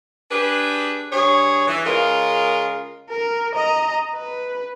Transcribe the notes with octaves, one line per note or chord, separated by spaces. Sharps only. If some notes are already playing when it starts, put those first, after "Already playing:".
D4 G4 G#4 B4
G2 G#4 C#5
E3
C#3 G#3 F4 A#4
A#4
D#5 A#5
B4